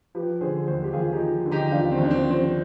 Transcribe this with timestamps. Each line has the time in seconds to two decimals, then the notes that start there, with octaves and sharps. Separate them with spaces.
0.15 F3 G4 B4
0.41 D3 G#4 C5
0.67 D#2 G#4 C5
0.84 G4
0.93 D#2 F4 G#4
1.13 D#4 G4
1.19 F3
1.46 D3
1.51 D#4 G4
1.71 D#2 D4 F4
1.92 C4
1.98 D#2
2.04 D4
2.11 C4
2.24 F3
2.30 C4